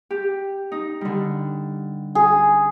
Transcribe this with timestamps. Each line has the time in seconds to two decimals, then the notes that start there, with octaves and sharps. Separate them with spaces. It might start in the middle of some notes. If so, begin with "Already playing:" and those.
0.11 G4
0.72 D#4
1.01 D3 G3
2.15 G#4